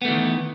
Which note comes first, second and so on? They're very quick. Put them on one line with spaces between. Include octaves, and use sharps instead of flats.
B3 A3 E3 D#3